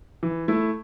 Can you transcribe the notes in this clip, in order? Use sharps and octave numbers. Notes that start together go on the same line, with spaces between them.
E3
A3 E4